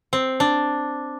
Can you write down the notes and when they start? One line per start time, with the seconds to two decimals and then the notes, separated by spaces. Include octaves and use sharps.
0.13 C4
0.40 D4